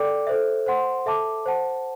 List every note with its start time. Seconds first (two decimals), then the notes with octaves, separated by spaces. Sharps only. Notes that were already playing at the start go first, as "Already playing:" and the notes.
Already playing: A4 D5 G5 D6
0.27 A4 C5 E5
0.66 C5 F#5 C6
1.06 A4 E5 A5 D6
1.46 C5 F#5 A5